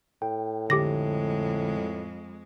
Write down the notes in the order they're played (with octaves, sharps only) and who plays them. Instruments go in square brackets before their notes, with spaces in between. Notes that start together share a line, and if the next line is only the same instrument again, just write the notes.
[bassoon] A2 [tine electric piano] G5
[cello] F2 G#3 [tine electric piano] D3 [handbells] G4 D6 A#6